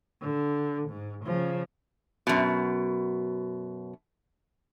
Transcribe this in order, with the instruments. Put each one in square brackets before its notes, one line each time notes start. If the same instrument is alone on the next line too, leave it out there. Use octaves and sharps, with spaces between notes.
[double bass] D3
G#2
C#3 F3
[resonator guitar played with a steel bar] F#2 B2